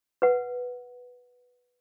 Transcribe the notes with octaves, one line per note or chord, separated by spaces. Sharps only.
B4 F#5